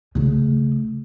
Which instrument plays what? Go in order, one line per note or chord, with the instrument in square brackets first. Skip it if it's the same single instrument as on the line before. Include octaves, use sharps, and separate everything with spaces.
[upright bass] C#3 A3